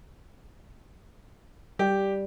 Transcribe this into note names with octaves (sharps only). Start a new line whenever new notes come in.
G3 G4